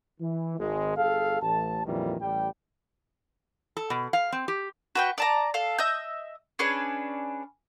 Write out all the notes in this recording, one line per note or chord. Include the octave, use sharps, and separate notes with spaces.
E3
G#1 G#3
G1 G#4 A4 F5
A1 A5
A#1 F2 A#2 D#3 E3 G3
A1 G3 G5
A4
B2
F5
C4
G4
F#4 B4 G5
D5 A5 A#5
A4 F5
D#5 E5 G6
C#4 D4 G#4 B4